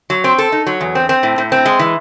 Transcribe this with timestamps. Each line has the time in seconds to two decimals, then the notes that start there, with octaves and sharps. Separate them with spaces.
0.10 F#3
0.24 C4
0.38 A4
0.52 D#4
0.67 F#3
0.81 E2
0.95 C4
1.09 C4
1.23 A2
1.38 A2
1.52 C4
1.66 G#3
1.79 E3